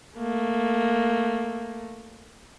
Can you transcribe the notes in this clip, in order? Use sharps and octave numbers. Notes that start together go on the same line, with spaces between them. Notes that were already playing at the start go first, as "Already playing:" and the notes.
A3 A#3